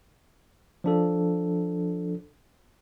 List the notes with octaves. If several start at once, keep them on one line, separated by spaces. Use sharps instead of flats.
F3 D4 A4